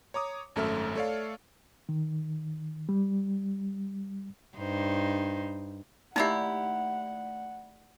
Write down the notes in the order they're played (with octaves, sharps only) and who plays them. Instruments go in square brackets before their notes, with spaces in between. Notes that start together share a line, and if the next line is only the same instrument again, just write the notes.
[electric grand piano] C#5 A#5 D6 D#6
G#1 F#2 A3 A4 E5 F6
A3 A4 C#5 D5 F5
[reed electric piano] D#3
G3
[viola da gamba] G2 D#4 C5
[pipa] D#3 A#3 E4 [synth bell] A3 D5 [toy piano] D#4 G4 [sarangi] F#5